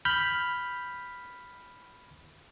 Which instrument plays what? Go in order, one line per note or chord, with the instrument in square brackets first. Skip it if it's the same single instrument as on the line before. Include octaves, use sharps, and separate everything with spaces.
[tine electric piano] B5 F6 G6 B6